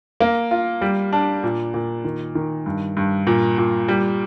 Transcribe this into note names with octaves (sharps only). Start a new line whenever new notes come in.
A#3
F4
G3
D4
A#2
A#2
D#3
D#3
G2
G2
A#2
A#2
G3